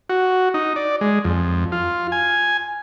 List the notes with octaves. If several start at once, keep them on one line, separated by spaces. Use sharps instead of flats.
F#4
D#4
D5
G#3
F2
F4
G#5